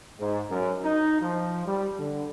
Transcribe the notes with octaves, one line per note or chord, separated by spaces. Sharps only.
G#2
F#2
D#4
F3
G3
D3